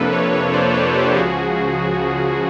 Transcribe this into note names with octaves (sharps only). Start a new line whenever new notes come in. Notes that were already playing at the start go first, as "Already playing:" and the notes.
Already playing: F2 C3 F3 A#3 D4 A4 B4
B4 C#5
B4 C#5
C5 D5
B4 C#5
G4 A4
C#2 C#3 F3 F#4 G#4